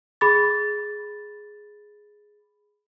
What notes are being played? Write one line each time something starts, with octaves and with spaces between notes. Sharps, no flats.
G#4 B5 D6 A6